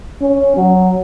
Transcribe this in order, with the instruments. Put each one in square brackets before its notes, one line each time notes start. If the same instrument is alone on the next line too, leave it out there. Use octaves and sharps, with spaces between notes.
[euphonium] C#4
F#3